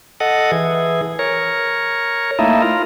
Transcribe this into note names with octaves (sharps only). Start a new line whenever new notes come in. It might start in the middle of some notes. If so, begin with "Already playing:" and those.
A4 D#5 F#5
E3 G#4
A#4 C#5
A3 A#3 D#4 E4
F4 A#4